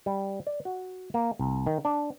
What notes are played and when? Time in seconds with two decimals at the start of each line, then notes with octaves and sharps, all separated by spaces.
0.06 G3
0.47 D5
0.65 F#4
1.14 A#3
1.40 C2
1.66 D#3
1.85 D4